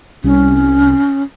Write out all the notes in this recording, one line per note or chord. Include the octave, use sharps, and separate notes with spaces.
C2 C#4